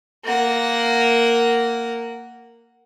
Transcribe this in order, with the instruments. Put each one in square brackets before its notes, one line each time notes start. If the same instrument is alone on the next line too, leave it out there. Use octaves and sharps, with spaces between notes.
[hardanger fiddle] A#3 F#5